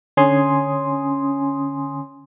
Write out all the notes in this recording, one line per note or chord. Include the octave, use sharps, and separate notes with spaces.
D3 C#4 G#5 C6 D#6